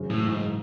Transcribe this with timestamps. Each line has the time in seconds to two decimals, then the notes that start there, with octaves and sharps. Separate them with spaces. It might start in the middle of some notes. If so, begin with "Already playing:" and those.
Already playing: F#1 F#2 E3 G#3 C#4
0.10 A2
0.28 G#2